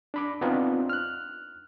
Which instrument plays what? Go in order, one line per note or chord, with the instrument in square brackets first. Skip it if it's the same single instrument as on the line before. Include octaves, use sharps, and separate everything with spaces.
[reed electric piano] D4 B5 D6
B3 C4 D4 D#4 F4
F6 F#6